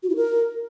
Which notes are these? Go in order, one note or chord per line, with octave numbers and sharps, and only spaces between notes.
F#4
E4
A#4